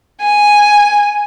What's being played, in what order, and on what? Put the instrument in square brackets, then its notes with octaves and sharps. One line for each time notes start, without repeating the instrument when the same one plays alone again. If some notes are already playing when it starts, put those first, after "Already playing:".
[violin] G#5